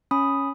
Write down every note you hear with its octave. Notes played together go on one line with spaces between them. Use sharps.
C#4 B5 D#6